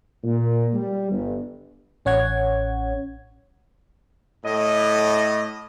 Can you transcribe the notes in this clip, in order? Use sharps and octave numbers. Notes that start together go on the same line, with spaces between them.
A#2
G3
G1
A1 C#4 C#5 F#5 G#6
A2 D#5